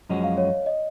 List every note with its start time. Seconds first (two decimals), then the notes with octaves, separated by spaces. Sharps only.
0.09 F#2 F3 G#3 C#4 F#4 D#5
0.24 F5
0.37 C#5
0.66 D#5